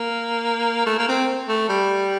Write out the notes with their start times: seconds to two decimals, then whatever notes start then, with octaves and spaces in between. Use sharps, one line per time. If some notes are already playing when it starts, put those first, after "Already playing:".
Already playing: A#3
0.86 A3
0.98 A#3
1.08 C4
1.48 A3
1.69 G3